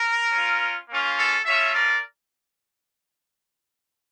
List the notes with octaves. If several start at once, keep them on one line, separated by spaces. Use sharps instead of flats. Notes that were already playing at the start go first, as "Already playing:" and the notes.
Already playing: A#4
C#4 F4
A#3 C#4 F4
A4
A3 C#4 F4 C#5 E5
A#4 D5